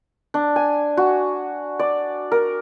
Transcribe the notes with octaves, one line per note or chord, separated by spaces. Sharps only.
D4
G#5
F#4
D5
A#4